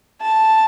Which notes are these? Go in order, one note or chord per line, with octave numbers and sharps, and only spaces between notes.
A5